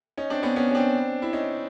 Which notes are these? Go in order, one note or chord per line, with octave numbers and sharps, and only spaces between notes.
C#4 D#4
C4 D4
B3 C#4
B3 C#4
C#4
C4 D4
E4
C#4 D#4